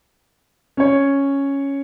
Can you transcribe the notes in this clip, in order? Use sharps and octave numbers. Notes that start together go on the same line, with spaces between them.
C#4 C#5